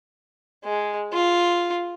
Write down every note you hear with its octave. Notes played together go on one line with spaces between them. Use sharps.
G#3
F4